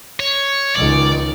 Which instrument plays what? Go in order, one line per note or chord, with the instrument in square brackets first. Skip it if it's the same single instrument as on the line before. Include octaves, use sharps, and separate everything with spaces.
[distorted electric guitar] C#5
[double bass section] C#2 D#3 [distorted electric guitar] D5